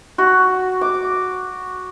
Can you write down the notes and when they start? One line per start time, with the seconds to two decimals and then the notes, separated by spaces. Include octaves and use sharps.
0.18 F#4
0.81 D6